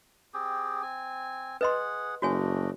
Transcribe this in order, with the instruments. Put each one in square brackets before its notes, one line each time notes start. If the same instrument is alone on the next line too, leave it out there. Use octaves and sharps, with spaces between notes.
[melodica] C4 G4 G#4
C4 G#5
[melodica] G#4 F#5 [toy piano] B4 D#5 C6
[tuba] F#1 [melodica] A3 D4 D#5 [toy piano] F#4 C#5 G#5